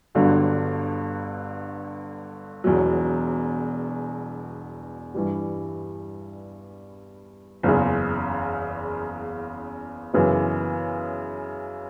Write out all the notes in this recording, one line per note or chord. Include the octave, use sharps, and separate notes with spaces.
G1 G2 D3 F#3
E1 E2 B2 F#3
G2 E3 G3
F#1 E2 C#3
F#2 C#3 E3 B3